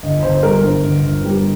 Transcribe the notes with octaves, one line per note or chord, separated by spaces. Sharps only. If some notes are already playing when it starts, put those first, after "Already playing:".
G1 D#5
G1 C5
C5
G3 A#4
G2 C5
G1
G1
G3